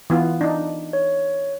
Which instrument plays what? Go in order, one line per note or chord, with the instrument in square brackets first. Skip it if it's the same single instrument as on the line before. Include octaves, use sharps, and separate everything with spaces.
[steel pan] E3 B3 F4
D4 D#4
[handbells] C#5